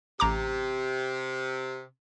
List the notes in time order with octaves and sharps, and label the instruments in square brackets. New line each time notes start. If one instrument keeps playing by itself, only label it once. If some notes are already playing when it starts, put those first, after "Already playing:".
[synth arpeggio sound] A1 A#5 D6 [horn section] C3